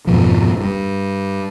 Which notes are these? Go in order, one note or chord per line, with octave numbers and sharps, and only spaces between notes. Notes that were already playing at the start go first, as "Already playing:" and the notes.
F2 G#2 B2 F3
G2